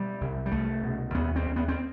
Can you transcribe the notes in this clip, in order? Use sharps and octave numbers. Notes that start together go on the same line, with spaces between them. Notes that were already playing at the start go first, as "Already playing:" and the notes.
Already playing: B2 G3
C2
G3
C2 A3
B2
D#2 B3
C4
D#2
B3
C4